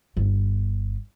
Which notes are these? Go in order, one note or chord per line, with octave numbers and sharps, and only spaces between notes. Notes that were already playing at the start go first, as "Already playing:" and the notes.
G1 E4